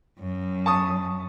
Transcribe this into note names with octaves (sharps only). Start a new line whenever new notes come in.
F#2
A5 C#6 D#6